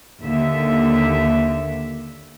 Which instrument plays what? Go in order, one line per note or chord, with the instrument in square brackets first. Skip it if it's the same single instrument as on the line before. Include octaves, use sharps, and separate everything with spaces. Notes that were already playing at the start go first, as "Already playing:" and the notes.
[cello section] D#2 D3 E5